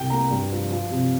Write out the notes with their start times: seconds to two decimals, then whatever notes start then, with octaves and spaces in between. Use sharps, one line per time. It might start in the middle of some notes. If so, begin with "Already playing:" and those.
Already playing: C2 G5
0.10 A#3 A#5
0.30 G2
0.51 F3
0.71 F3
0.90 C3